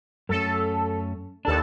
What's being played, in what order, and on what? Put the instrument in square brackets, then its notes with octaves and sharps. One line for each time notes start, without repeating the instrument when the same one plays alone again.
[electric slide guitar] F#2 A3 C#4 [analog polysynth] A4
[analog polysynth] D#2 A4 A5 [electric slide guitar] D4